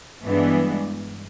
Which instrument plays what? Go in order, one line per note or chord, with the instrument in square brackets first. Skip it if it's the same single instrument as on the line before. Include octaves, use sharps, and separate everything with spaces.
[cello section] G2 E3 G#3 B3 D4